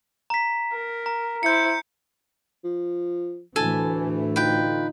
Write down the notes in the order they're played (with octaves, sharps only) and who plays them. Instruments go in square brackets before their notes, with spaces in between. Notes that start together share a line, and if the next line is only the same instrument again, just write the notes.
[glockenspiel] A#5 B6
[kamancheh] A#4
[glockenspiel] A#5
[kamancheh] E4 C5 [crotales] G6 C#7
[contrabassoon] F3
[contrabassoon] D2 [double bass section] A2 E3 A3 [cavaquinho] A4 G#5
[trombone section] D3 D#4 F4 [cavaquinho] B4 G5